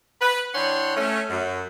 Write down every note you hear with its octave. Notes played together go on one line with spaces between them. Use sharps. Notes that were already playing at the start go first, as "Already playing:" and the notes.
B4
E3 D4 C#5 F#5 G5 C6
A3 C#4
F#2